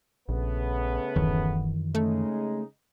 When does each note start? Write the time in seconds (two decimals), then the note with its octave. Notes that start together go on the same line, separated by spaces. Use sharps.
0.29 A#1 C#3 A3 B3
1.16 D1 F#2 D#3 E3
1.95 C#3 G#3 A3 D#4